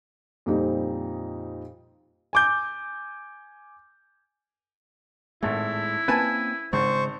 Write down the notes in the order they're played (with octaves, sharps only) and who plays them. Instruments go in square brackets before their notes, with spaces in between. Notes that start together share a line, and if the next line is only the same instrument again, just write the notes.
[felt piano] F2 A#2 G3 C4 D#4
[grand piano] G#5 D6 G6
[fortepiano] G#1 A3 [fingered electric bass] A2 G#3 [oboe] E4
[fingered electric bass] A#3 C4 C#4 [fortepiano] B4 G#5 A5
[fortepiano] G#1 [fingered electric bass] C#3 G#3 [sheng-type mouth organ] C5 C#6